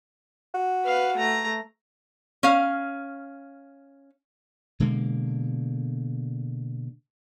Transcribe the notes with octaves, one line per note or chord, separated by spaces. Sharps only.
F#4
B4 F5
A3 A#5
C#4 F5
B2 D3 G#3 A#3